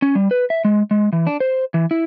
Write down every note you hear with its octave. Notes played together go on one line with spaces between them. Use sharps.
C#4
G3
B4
E5
G#3
G#3
E3
D4
C5
E3
E4